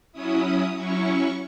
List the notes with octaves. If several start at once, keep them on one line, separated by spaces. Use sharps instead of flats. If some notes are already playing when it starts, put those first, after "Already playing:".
F#3 C#4 E4 D#6
F#3 C#4 E4 C#6